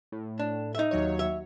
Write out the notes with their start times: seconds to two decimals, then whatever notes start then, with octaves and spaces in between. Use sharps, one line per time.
0.12 A2
0.39 D4
0.75 D#4 E5
0.91 D#2 F#3 C#5
1.19 E5